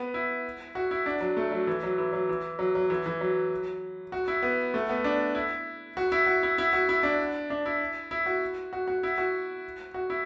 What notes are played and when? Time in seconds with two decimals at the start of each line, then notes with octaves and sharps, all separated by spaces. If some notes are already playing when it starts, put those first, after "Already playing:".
Already playing: B3
0.14 E4
0.75 F#4
0.91 E4
1.06 D4
1.21 F#3
1.37 A3
1.52 F#3
1.67 E3
1.83 F#3
1.98 E3
2.13 F#3
2.29 E3
2.59 F#3
2.75 F#3
2.90 E3
3.06 E3
3.21 F#3
4.12 F#4
4.28 E4
4.43 B3
4.74 A3
4.89 B3
5.04 D4
5.35 E4
5.97 F#4
6.12 E4
6.27 F#4
6.43 E4
6.58 E4
6.73 F#4
6.89 E4
7.03 D4
7.50 D4
7.66 E4
8.11 E4
8.26 F#4
8.73 F#4
8.87 F#4
9.03 E4
9.18 F#4
9.94 F#4
10.10 E4